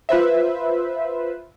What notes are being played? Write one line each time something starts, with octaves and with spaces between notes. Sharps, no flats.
F4 B4 C5 E5